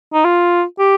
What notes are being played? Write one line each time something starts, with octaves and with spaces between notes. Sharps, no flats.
D#4
F4
G4